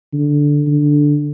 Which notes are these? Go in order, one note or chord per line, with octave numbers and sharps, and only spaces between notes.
D3
D3